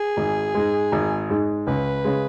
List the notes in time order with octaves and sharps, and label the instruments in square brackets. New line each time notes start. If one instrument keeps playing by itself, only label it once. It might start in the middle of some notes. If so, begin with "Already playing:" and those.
Already playing: [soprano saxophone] G#4
[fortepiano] G#1
G#2 G#3
G#1
G#2 G#3
[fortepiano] C#2 [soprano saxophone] B4
[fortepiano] C#3 G#3